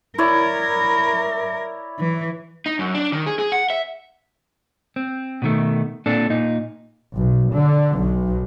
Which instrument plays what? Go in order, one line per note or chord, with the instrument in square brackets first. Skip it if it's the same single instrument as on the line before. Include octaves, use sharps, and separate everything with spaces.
[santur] E4 C#5 D5 [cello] A#4
[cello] E3
[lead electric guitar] D#4
F#2
D4
D#3
G#4
G#4
F#5
E5
[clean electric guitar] C4
B2 D#3 A3
A#2 C4 D4 A4
A#2 D#4
[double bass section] B1
D3
B1